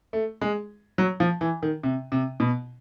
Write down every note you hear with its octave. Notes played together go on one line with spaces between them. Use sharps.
A3
G#3
F#3
F3
E3
D#3
C3
C3
B2